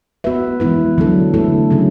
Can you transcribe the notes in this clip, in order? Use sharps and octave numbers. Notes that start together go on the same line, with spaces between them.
B3 F#4 B4 E5
E3 G#3 B3 E4 B4
D3 F#3 B3 D4 A4
D3 A3 E4 A4
C#3 F#3 C#4 G#4